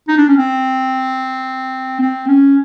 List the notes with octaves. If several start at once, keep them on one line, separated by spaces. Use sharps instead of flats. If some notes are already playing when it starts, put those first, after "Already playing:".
D#4
D4
C#4
C4
C4
C#4